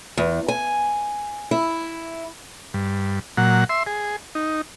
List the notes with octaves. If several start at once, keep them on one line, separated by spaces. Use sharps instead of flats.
E2
G#5
E4
G2
A#2 F#3 F#5
E5 C6
G#4
D#4